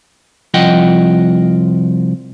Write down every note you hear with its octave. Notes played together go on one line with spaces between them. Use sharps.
C2 F3 F4 D#5 F#5 G5